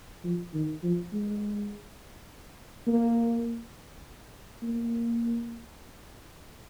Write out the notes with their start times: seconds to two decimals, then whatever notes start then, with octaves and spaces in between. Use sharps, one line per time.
0.24 F3
0.54 D#3
0.83 F3
1.13 G#3
2.87 A#3
4.63 A#3